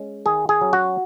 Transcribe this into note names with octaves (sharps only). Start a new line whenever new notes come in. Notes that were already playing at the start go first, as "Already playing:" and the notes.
Already playing: G#3 C#4
D#3 G#4
G#4
F#3 C#4
F#4